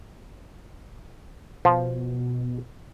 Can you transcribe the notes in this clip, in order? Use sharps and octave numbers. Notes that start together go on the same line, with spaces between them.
B2 F3